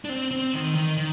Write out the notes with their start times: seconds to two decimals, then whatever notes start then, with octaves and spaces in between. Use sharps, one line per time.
0.05 D4
0.09 C4
0.31 C4
0.54 D#3
0.75 D#3
0.97 D#3